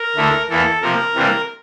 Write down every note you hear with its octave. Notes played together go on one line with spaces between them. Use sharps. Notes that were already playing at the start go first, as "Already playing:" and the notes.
Already playing: A#4
D2 D3 A3 E4
E2 E3 A#3 E4 A4
C3 F3 A#3 A#4
C3 E3 G3 A#3 D4